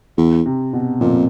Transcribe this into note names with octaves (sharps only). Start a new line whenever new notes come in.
E2
C3
B2
F2 A#2